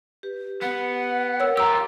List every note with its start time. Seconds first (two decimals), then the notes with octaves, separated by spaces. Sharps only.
0.23 G4 B4
0.62 B3 F#5
1.40 A#4 C#5 E6
1.57 F4 G4 A#5 E6